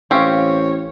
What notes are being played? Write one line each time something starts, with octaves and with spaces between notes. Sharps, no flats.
A1 C4 C#4 G4 C#5 F5